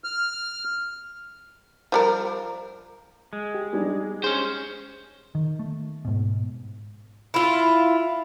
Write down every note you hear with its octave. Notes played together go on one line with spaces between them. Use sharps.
F6
F3 G3 A#4
G#3
G4
G3 D4 D#4
C#4 G#4 C5
D#3
A3
G#2 B2
E4 F4